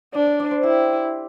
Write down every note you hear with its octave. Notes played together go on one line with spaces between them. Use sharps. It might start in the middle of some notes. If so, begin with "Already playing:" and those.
D4 D5
D5
D5
C5
E4 G4